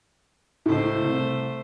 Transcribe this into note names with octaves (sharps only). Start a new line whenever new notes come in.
C#2 A2 A3 C5
C2